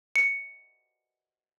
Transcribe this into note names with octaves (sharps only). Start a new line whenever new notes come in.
C#7